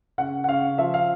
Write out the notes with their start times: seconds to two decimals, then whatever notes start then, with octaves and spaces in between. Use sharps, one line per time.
0.18 C#3 F#5
0.44 F#5
0.48 C#3 F5
0.78 F3 E5
0.94 F5